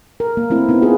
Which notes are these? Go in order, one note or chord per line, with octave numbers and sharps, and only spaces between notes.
A#4
A#3
A3 C4 E4
B3 C4 D#4 E4
F4 G#4 B4